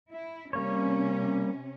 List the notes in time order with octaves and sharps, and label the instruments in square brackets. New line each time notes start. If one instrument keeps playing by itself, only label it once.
[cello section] E4
[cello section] C3 C#4 [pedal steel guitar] G3 A#3 C#5